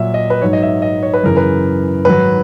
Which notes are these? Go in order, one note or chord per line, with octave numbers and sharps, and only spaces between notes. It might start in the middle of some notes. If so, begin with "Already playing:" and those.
Already playing: A#2 F#3 E5
D#5
B4
G#2 F#3 C#5
D#5
E5
D#5
C#5
B4
F#2 C#3 E3 A#4
B4
G#2 D#3 F#3 B4